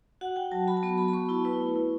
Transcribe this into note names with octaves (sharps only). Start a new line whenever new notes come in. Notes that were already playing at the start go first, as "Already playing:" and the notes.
F#4 F#5
F#4 G5
F#3 A5
F#4 B5
A5
B3 B5
F#4 B5
B5
B3 C#6
E4 A5
E4 B4
A3
E4